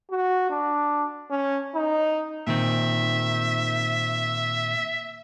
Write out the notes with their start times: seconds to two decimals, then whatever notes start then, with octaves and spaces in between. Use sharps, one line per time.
0.11 F#4
0.50 D4
1.31 C#4
1.75 D#4
2.47 A#2 D#3 C4 E5